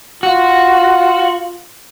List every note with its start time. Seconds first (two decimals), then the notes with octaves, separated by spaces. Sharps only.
0.23 F4 F#4